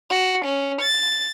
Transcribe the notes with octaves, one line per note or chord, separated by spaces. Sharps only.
F#4
C#4
A6